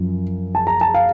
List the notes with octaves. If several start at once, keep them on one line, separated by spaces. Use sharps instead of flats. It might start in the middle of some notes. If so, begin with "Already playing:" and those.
Already playing: F#2 F3
A5
A#5
A5
F5